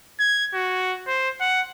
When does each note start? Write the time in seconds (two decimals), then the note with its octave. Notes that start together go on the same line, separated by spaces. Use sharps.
0.20 G#6
0.54 F#4
1.07 C5
1.41 F#5